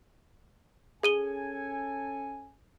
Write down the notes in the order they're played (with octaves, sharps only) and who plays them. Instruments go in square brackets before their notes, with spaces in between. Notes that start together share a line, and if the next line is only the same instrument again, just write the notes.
[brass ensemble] C#4 A4 G#5 [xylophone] G#4 D#7 G7